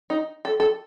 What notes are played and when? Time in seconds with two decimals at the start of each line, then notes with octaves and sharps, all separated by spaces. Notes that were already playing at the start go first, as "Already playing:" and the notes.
0.10 D#4
0.45 A4
0.60 A4